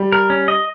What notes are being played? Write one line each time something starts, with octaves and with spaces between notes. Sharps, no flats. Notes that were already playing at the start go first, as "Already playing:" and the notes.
Already playing: G3
A#4
C#4
D#5